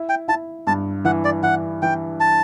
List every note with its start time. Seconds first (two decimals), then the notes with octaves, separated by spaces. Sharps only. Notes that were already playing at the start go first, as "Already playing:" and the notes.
Already playing: E4
0.09 G5
0.28 E4 A5
0.67 G2 A5
1.05 E3 F#5
1.24 D5
1.43 E3 F#5
1.82 E3 G5
2.20 A5